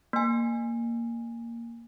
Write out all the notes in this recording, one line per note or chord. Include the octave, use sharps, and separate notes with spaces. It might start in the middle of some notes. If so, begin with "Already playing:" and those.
A#3 G#5